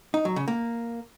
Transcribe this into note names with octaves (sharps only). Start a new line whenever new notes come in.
D#4
F#3
C#3
A#3